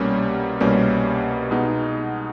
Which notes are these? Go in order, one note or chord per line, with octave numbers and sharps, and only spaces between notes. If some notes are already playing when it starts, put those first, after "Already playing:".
Already playing: C2 B2 G3 A#3 C#4
C2 B2 G3 A#3 C#4
B2 G#3 B3 D#4